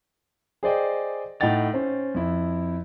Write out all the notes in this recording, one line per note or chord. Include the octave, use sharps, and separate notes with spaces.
G#4 C5 D5 D#5 G5
A2 D#4 F#5 G5 A6 F7
C#4 C5
F2 E4